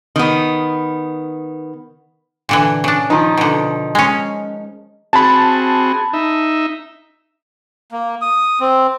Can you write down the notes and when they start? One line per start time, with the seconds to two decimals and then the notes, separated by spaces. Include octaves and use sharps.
0.16 D#3 B3
2.49 A#2 D3 E3
2.84 C#3 D4
3.10 D#3 F3 D#4
3.37 B2 D3
3.95 G#3 C#4
5.13 C4 F#4 G#4 A5 B5
6.13 D#4 E5
7.92 A#3
8.22 D#6
8.60 C4